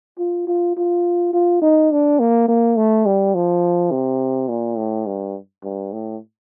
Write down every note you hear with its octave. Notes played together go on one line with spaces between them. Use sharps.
F4
F4
F4
F4
D#4
D4
A#3
A#3
A3
G3
F3
C3
A#2
A2
G2
G2
A2